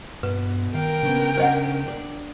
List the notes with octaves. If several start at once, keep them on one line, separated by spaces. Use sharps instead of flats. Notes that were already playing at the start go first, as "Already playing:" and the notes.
G2 B2 B4
D#3 A#4 F5 G5
C#3 B3 C#4 D4
C#4 D4 C5 D#5 F#5
D4 D5